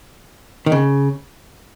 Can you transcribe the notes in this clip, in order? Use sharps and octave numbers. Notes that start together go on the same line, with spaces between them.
D#3
C#3